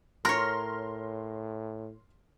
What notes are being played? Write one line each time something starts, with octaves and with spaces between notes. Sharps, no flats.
A2 A#4 C#5 C6 F6 A#6